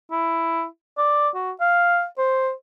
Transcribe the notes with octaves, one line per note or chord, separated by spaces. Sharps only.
E4
D5
F#4
F5
C5